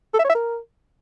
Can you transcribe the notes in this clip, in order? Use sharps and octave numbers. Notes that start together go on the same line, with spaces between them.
A4
E5
C#5
E5
A#4